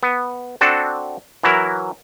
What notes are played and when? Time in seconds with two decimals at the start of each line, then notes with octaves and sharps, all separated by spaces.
0.03 B3
0.61 C4 D4 F#4 A4
1.43 E3 F#3 E4 A#4